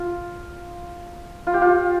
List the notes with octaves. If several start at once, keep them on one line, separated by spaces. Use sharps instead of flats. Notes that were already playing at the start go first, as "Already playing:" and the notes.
Already playing: F4
F4
G4
F4